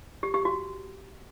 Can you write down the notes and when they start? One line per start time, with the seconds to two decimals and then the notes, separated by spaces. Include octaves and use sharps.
0.23 G4
0.34 G4
0.45 F#4